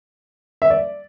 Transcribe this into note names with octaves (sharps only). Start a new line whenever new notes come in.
E5
D5